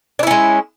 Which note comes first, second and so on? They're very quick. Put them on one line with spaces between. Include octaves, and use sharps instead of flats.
D4 E4 C#4 G#3